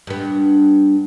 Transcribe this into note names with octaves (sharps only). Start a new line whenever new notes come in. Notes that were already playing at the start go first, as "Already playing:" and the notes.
G2 B3